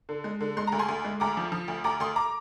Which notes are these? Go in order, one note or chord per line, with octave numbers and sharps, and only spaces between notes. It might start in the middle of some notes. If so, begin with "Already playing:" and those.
D3
G#3
D3
G#3 C6
D2 A#5
G#5 C6
D2
G#3
D2 A#5 D6
F3
F3
D2
D2 A#5 D6
D2 C6 D#6
A#5 D6